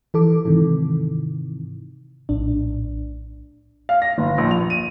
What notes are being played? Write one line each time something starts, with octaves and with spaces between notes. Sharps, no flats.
E3 A4 D6
G#2 C3 D#3 E3
A#1 A2 D4
F5
A#6
G1
A#1
F7
D#7